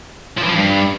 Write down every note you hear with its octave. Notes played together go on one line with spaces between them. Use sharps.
F3
E3
F3
G2